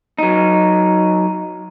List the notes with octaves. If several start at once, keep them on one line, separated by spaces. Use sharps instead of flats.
F#3 D#4